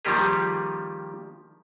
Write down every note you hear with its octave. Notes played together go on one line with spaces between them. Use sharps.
D#3 F3 G3 A#3 G4 G#4